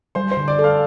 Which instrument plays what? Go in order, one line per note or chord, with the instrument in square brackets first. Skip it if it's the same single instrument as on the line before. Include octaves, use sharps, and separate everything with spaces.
[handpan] G3 [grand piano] C5 C6
[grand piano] C5 C6
[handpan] D3
[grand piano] D5 D6
[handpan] A4
[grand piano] F5 F6